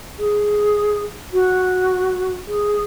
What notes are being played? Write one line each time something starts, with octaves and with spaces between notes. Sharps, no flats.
G#4
F#4
G#4